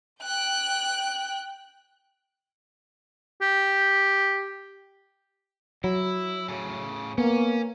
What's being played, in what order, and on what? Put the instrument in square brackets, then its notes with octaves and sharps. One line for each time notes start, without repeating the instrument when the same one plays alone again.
[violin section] G5 [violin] F#6
[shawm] G4
[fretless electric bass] F#3 [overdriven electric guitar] E4
[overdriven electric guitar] A2 C#3
[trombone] A#3 [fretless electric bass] B3 [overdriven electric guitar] C#4